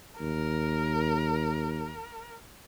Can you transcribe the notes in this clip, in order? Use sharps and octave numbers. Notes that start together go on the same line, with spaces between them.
D#2 A#4